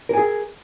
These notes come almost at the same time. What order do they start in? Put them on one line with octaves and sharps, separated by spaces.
A#4 G#5 G#4